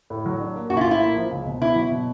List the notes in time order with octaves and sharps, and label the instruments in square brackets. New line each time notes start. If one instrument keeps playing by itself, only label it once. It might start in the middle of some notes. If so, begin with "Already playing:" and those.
[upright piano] A2
F#3
D4
A#3
[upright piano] A#1 [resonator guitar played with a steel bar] F#4
[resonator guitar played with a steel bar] E4
F4
[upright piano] A2
[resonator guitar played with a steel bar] E4
[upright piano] A#3
F3
C#2
B2
[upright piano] B3 [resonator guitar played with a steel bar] E4
[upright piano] F#3
B2